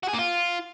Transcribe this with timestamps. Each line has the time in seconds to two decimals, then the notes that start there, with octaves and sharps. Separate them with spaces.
0.03 F#4
0.08 G#4
0.14 A#3
0.19 F4